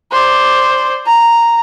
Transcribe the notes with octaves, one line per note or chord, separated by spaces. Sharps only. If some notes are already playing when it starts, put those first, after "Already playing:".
C5 D5
A#5